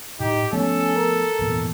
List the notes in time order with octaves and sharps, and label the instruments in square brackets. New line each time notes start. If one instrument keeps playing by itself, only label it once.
[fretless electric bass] A2 [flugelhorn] D#4 [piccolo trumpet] G4
[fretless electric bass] F3 A3 B3 [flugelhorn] C#4 [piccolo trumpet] A4
[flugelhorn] A#4
[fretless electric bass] G#1 E2 A#2